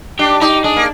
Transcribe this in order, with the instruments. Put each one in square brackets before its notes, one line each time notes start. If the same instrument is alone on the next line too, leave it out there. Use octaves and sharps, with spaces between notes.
[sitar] D4 [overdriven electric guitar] G4
[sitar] D#4 [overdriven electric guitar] G4
[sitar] D4 [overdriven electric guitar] G#4
[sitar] A#3